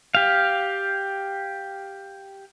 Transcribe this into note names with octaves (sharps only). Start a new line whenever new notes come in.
G4 F5